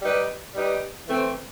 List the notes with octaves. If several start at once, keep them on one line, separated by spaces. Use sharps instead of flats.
G3 D#4 G4 B4
G3 D#4 G4 B4
E3 A3 C4